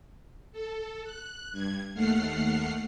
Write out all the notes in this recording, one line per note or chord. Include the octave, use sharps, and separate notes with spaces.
A4
F#6
G2 G#6
D#2 A3 F#5 F6 C7